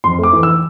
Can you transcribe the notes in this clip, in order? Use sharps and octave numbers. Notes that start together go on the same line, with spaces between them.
F2 C6
A3 D6
E3
E6